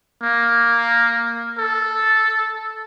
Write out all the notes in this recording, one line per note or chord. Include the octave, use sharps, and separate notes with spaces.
A#3
A4